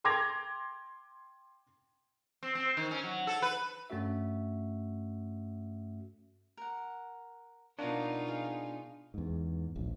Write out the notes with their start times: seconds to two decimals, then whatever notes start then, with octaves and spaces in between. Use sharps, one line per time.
0.04 G5 C6 D6 G#6 A#6 F7
2.43 C4
2.55 C4
2.77 D#3
2.91 C#4
3.03 F#3
3.27 A4
3.42 B4
3.90 G2 A3 C#4 F#4 E5
6.57 A#4 F#5
7.79 B2 A#3 D4 D#4 F4 C#5 F#5 A#5
8.28 G#3 G#4 F5
9.14 E2 G#2
9.75 D1 A#1